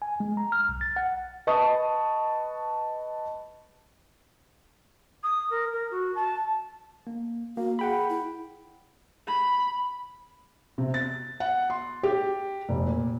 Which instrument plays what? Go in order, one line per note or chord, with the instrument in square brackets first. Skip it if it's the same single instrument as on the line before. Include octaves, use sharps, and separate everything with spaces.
[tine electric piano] G#5
G#3
A#5
F6
B1
A6
F#5
[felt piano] B4 D#5 A5 C#6 D#6
[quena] D#6
A#4
A#4
F#4
A5
[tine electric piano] A#3
[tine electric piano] A#3 [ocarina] F#4
[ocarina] G#4 [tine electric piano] F#5 G5 B5
[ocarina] E4
[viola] B5
[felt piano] C3
A6
F#5
C6
G4
F1
A#2